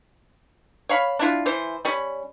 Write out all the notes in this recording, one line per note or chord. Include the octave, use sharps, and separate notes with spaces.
C#5 F5 B5
D4 E4 F4
E3 C5
G3 C#4 B5